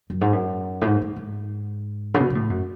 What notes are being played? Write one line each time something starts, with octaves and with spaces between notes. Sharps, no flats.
F#2
G#2
F#2
A2
G#2
G#2
G#2
C#3
B2
B2
A2
F#2